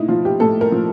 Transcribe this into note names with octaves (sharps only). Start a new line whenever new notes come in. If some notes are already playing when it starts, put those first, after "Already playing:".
Already playing: A2 D#4 E4
F3 F4
G4
A2 A4
A#4
F3